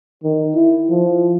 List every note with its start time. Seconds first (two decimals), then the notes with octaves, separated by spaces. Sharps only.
0.24 D#3
0.56 E4
0.90 F3